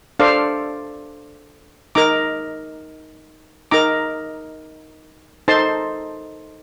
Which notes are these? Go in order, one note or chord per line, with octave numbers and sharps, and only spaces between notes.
D4 A4 C5 D5 F5
D#4 A#4 A#5 D6
D#4 A#4 A#5 D6
D#4 A4 C5 A5 C6